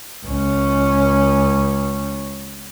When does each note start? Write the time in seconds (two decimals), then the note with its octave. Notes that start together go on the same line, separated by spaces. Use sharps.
0.25 C#2 C#4